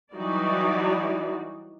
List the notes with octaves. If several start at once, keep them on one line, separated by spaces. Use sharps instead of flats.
E3 F#3 G3 D#4 F#4 D5